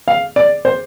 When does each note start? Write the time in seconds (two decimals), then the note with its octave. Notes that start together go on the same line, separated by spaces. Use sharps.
0.08 F5
0.36 D5
0.65 C5